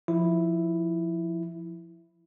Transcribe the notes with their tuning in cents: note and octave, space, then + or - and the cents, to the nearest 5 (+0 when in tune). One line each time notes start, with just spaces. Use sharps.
F3 -5 E4 +0